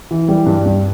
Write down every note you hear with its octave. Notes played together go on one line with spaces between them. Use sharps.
E3
G3
G2
G2